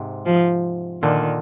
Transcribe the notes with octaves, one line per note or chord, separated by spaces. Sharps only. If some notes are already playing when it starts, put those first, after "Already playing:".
Already playing: G#2 C3
F3
A#2 D3 D#3